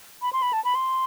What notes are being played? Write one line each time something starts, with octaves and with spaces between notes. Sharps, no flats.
B5
C6
B5
A5
B5
C6